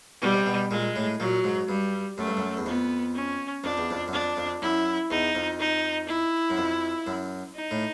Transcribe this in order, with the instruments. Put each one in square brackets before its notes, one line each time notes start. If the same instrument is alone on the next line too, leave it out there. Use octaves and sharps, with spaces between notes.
[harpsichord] B2 [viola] G3
[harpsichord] C3
B2
[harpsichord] A#2 [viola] G#3
[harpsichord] A2
[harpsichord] A#2 [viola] F#3
[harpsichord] G#2
[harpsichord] G2 [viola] G3
[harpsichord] F#2 [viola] A3
[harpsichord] G2
F#2
E2
[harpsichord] F2 [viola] B3
[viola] C#4
[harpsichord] F2 [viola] D4
[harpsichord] E2
F2
F#2
[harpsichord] F2 [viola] D4
[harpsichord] F2
[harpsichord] F#2 [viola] E4
[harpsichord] E2 [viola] D#4
[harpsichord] F2
[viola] D#4
E4
[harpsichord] F#2
F2
F#2
[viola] D#4
[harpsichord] A2